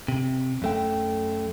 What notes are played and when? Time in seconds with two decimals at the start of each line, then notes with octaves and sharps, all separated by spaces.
0.08 C3
0.62 F#2 A3 G5